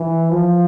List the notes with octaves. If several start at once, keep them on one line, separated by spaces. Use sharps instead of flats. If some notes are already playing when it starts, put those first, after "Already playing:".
Already playing: E3
F3